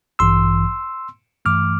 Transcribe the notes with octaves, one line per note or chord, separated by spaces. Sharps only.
A1 G2 E3 C6 E6
G2 E3 A3 D6 F6